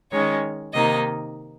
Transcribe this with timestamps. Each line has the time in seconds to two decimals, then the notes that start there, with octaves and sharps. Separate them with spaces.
0.12 D#3 G#3 C#4 C#5
0.74 C3 D#3 A#3 D#4 D#5